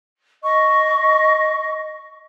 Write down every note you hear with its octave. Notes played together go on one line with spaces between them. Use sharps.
D#5 C#6